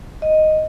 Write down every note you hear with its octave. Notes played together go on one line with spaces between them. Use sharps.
D#5